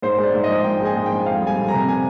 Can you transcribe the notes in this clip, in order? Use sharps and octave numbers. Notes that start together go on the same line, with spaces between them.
G#2 C5
G#3
D5
G#2
D#5
F3
G#2 G5
G#3
G#5
G#2
G5
F3
F2 F5
G3 G#5
F2
C3 A#5
G#5